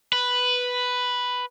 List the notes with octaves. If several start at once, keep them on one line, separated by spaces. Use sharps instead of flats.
B4